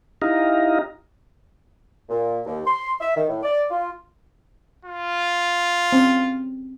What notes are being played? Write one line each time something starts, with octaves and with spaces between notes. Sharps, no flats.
D#4 E4 G4 D#5 F5 A#5
A#2
D#2
C6
E5
D#3
A2
D5
F4
F4
C4 C#4